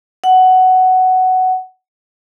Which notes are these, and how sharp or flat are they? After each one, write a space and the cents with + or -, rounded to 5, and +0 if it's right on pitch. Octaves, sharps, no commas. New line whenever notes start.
F#5 +10